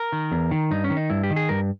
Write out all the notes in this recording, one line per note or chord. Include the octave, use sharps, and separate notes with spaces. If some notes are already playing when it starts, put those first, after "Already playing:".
Already playing: A#4
D#3
E2
D#3
G2 D#4
C#4
D#3
D#4
G2 E4
G4
D#3
G#4
G2 A#4